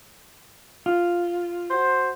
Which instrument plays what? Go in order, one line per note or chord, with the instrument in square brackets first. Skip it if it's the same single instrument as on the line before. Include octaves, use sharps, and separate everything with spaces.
[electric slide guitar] F4
[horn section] F#4 C5